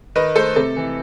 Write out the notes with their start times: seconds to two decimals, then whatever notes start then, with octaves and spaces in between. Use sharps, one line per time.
0.15 D#3 B4 D#5
0.36 A3 A4 C5
0.56 C3 A4
0.77 E3